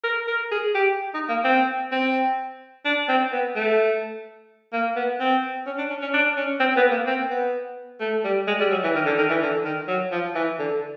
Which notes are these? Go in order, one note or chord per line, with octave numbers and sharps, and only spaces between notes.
A#4
A#4
G#4
G4
D#4
A#3
C4
C4
D4
C4
B3
A3
A#3
B3
C4
C#4
D4
C#4
C#4
D4
C#4
C4
B3
A#3
C4
B3
A3
G3
G#3
G3
F#3
E3
D#3
D3
D#3
E3
D3
D#3
F#3
F3
E3
D3